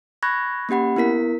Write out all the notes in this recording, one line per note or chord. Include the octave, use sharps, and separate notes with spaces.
B5 C#6 F#6 G#6 A#6
A#3 C#4 G4 F#5 B5
B3 E4 A#4 B6